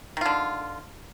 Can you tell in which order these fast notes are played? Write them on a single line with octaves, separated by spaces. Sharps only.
D#3 F4 D3